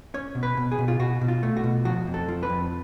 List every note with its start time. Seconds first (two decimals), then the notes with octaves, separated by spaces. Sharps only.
0.14 C#4 C#5
0.35 B2
0.43 B4
0.57 B2
0.72 G#4
0.79 B2
0.88 F4
0.99 B2 F#4
1.21 B2
1.28 F4
1.43 A3
1.57 F#4
1.64 B2
1.85 F3 F#4
2.07 F2
2.14 A4
2.28 F3
2.43 B4
2.50 F2